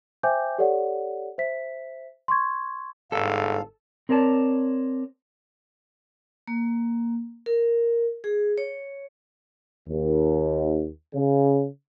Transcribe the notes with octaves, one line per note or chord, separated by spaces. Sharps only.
C5 E5 G5 G#5 D6 G6
G4 A4 C#5 D5 F#5
C5 E5 B6
C6 C#6 G#6
G1 G#2 A4 F5
C4 A#4 C#5 D5 A5
A#3
A#4
G#4
C#5
D#2
C#3